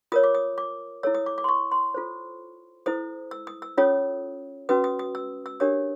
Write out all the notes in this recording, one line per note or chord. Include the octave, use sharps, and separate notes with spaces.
F4 A#4 C#5 D#6
D6
D#6
D6
E4 A4 C#5 E6
D#6
D6
D6
C6
C#6
C6
F4 A4 C5
E4 A4 C5 D#6
E6
D#6
E6
C#4 F4 A4 C#5 D#6
C#4 F#4 B4 D#6
D#6
D#6
E6
E6
D4 G4 A#4 C#5 D#6